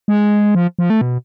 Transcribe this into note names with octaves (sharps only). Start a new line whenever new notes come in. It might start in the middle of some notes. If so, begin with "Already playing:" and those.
G#3
F3
F3
A3
B2